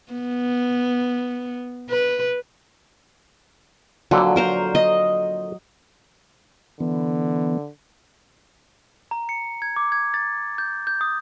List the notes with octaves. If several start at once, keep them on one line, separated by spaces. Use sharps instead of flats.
B3
B4
F2 A#2 D3 F#3
A#4 C5 A#5
D#5
D3 E3 B3
A#5
C#7
G#6
D6
G#6
A6
G6
G6
D#6